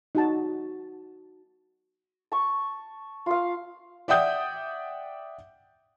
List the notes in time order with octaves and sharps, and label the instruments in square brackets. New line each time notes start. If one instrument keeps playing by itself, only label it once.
[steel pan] D#4 F#4 A5
[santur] A5 C#6
F4 F5
[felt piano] D5 E5 F#5 G5 D#6 G6